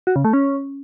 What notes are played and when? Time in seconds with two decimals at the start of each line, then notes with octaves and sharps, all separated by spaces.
0.07 F#4
0.16 C#3
0.25 A3
0.33 C#4